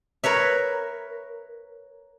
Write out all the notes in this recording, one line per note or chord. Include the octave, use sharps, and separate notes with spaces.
A#4 B4 C#5 E5